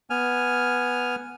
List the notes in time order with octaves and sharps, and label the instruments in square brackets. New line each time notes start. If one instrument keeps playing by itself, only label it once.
[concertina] B3 G#5 F6